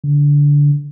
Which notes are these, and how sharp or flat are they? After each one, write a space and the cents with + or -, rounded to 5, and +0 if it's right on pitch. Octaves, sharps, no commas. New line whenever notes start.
D3 -20